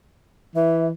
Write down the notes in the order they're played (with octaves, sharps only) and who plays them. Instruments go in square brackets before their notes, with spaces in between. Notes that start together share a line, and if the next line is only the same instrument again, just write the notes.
[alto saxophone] E3 [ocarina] E5